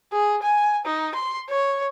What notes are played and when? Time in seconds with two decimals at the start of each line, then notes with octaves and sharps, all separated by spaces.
0.13 G#4
0.42 G#5
0.85 D#4
1.15 C6
1.49 C#5